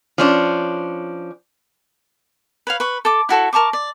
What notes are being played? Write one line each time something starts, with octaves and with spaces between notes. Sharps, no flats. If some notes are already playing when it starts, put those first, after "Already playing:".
F3 C#4 D4
B4 C#5 F5
B4 C#6
A4 D6
E4 F#4 A4 C#6
A#4 A5 C#6 D6
D5